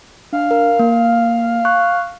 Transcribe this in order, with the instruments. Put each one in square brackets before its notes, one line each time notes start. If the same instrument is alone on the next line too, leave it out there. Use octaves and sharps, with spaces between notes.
[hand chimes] D4 [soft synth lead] F5
[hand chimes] A#4
A#3
C#6 F#6